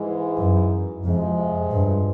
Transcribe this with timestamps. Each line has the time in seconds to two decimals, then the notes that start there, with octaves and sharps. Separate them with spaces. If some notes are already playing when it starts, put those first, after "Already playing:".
Already playing: G#2 E3 G#3
0.37 F#2
1.04 F2 C3 F3 G#3
1.71 G2